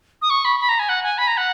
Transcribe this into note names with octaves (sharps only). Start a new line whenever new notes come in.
D#6
C#6
B5
B5
A#5
G#5
F#5
G#5
B5
A#5
F#5